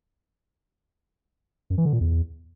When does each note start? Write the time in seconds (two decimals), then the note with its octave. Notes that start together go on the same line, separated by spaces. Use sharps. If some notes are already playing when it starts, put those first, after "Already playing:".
1.70 F#2
1.78 E3
1.85 D3
1.93 A#2
2.01 E2